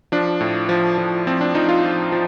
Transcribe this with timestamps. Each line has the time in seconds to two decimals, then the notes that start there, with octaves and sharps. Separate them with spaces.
0.12 F3 D4
0.41 A2
0.69 F3
0.98 F3
1.27 F3 C4
1.41 D4
1.55 F3 D#4
1.69 F4
1.84 F3
2.12 F3